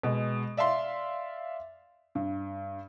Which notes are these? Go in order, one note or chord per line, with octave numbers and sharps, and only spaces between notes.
B2 G#3
D5 E5 F5 C6
G2